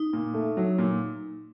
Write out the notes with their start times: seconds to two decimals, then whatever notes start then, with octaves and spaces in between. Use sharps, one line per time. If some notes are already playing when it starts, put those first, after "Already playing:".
Already playing: D#4
0.13 A#2
0.34 A3
0.57 F#3
0.78 A#2